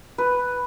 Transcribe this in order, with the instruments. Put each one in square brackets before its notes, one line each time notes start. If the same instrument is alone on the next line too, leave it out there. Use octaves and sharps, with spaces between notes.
[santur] B4